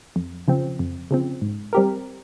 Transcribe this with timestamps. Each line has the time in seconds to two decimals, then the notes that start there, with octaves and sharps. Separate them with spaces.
0.16 F2
0.48 C#3 F3 C4
0.79 F2
1.11 C#3 F3 C4
1.42 G#2
1.73 G3 C4 G4 A#4